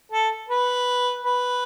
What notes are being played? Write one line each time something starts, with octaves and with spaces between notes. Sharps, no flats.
A4
B4
B4